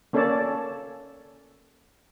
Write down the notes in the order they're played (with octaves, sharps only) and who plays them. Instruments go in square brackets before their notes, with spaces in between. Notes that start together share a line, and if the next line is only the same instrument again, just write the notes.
[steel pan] A#3 C#4 A4 C#5 D5 A5